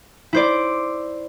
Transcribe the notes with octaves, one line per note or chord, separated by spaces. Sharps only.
E4 C5 D5